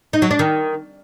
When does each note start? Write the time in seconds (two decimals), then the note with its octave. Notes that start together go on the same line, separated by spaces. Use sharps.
0.13 D#4
0.22 F#3
0.31 D4
0.39 D#3